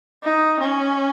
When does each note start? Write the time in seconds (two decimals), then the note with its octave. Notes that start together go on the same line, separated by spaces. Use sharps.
0.24 D#4
0.61 C#4